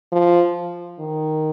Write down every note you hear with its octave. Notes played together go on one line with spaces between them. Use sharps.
F3
D#3